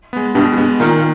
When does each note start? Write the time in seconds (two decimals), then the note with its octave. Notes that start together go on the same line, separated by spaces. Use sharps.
0.13 G#3 B3
0.35 G2 B2
0.52 E2
0.56 G2 G#3 B3
0.80 A#2 D#3
0.97 A#2